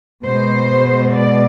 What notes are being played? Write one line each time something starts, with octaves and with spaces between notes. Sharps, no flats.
B2 G#3 C5
D5